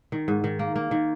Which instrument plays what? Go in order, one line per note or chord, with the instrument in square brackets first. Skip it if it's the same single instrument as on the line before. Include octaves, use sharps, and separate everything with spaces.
[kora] D#3
G#2
D#3
A#3
A#3
D#3